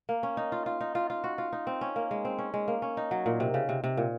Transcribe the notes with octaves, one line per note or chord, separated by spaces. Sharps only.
A#3
C#4
D#4
F4
F4
D#4
F4
F4
F#4
F4
D#4
C4
C#4
A#3
G#3
C4
C#4
G#3
A#3
C#4
D#4
F#3
A#2
C3
C#3
C3
C3
A#2